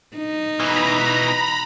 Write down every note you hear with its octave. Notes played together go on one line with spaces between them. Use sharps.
D#4
B2 E3 A#5 B5